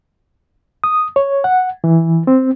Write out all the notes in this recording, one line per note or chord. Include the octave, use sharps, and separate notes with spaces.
D#6
C#5
F#5
E3
C4